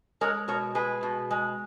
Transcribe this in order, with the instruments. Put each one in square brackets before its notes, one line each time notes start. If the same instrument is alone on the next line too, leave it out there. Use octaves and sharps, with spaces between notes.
[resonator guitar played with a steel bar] G#3 A#4 C#5
B2 A#4 C#5
G#3 G#4 B4
B2
G#3